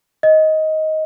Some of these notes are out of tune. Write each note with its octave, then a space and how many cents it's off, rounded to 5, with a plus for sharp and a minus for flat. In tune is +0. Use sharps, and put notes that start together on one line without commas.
D#5 +15